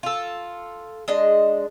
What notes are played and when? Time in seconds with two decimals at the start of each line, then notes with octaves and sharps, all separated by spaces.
0.03 F4 A4
1.08 G#3 D4 D#5